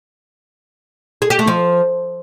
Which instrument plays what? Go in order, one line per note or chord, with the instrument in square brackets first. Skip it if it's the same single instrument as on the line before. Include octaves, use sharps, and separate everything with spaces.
[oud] G#4
G4
A3
F3